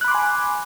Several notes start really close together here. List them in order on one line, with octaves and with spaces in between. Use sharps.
F#6 B5 D6 C6 G#5